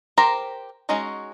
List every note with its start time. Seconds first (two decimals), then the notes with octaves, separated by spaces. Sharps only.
0.18 G4 A#4 C5 A#5
0.89 G#3 C#4 D#4 F#4